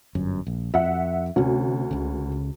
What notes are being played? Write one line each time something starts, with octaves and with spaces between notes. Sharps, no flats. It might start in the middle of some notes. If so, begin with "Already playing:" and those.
G1 F#2
A#1
F2 E5 F#5
D2 C3 C#4
C#2 C#3